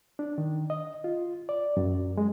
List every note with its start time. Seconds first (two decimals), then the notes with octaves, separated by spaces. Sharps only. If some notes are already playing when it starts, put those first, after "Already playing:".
0.19 D4
0.38 D#3
0.70 D#5
1.04 F4
1.49 D5
1.77 F#2
2.17 G#3